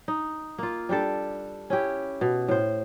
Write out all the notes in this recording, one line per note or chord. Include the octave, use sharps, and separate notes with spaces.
D#4
A#3 F4
G3 D4 G4 A4
C#4 E4 G4
B2
A2 C5